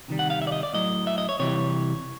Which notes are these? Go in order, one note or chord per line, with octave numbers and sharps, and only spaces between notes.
C3 D#3 G3
F#5
F5
E5
D5
D#5
D5
A2 F#3 D#5
E5
D#5
C#5
C3 E3 G3 C#5